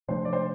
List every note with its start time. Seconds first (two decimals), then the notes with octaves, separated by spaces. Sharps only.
0.08 C3 F3 A3 D4 C5
0.25 D5
0.33 C5